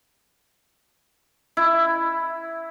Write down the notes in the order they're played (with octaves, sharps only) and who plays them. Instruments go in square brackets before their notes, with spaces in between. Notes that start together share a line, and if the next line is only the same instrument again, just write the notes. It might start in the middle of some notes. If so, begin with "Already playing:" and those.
[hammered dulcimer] E4